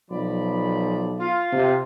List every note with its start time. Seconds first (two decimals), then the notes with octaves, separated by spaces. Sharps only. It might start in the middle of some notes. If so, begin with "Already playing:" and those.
0.11 B1 F3 D5 B5
1.20 F4
1.53 C3